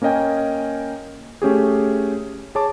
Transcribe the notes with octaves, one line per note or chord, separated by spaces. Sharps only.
A#3 C#4 A#4 D#5 G5 G#5
A3 C#4 G4 G#4
G#4 C#5 A5 D6